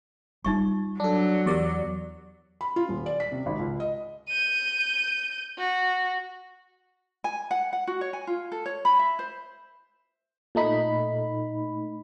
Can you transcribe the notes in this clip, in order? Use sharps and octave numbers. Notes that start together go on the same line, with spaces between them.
G3 D#4 F4 E5 C#6
F#3 D4 A4
E2 G4 A#4 D5 E6
B5
F4
D#1
D5
B6
C3
G#1
C#2
D#5
G6 D#7
F#4
G#5
F#5
F#5
F#4
C#5
G#5
F4
A4
C#5
B5
E5
C5
A#2 A3 D#4 B5